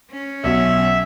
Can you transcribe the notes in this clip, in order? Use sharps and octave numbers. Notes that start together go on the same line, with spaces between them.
C#4
B1 E5